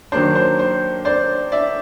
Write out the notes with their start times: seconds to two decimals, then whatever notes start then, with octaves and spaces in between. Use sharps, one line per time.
0.12 D#3 F#3 A#3 D4 C5
0.35 C5
0.59 C5
1.05 C5 D5
1.52 D5 E5